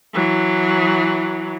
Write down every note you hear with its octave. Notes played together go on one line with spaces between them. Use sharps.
E3 F#3